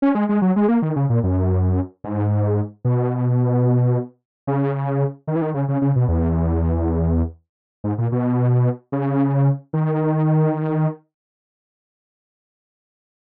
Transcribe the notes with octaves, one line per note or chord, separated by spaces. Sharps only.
C#4
G#3
G#3
F#3
G#3
A#3
D#3
C#3
A#2
F#2
G#2
B2
C#3
D#3
E3
D#3
C#3
C#3
C#3
B2
E2
G#2
A#2
B2
C#3
D#3